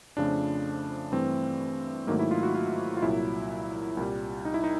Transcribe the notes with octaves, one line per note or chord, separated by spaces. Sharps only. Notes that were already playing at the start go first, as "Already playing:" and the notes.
F2 C#3 F3 A3 D4
G2 E3 A3 C4
G#2 D#3 F#3 A3 A#3
E4
F4
F#4
F4
F4
C2 A#2 F#3 E4
C2 A#2 G3
D#4
E4
D#4